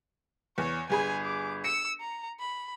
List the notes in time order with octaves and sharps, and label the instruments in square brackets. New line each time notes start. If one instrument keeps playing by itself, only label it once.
[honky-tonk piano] E2 [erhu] C#5
[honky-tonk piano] G1 G#4 B5 [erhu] G#5
[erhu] D6
[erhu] E6 [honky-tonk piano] C#7
[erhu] A#5
B5